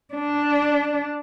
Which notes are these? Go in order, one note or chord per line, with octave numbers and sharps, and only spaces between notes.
D4